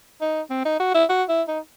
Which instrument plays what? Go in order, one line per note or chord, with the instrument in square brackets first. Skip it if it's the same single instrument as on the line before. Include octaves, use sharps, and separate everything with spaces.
[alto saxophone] D#4
C4
D#4
F#4
E4
F#4
E4
D#4